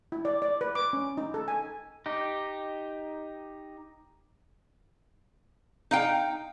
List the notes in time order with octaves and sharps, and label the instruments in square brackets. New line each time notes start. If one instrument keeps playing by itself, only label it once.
[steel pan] E4
D5
D5
B4
D6
C#4
D#4
A4
G#5
[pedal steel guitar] D#4 G4
[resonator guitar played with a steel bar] D#4 F5 G5